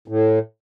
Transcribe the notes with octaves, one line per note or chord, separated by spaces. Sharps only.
A2